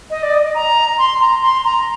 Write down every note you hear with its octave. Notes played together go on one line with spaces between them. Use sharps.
D#5
D5
D#5
A#5
C6
A#5
C6
A#5